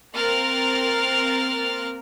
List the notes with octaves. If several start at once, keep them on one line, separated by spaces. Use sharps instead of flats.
A#3 C4 A#4 F6 F#6 A6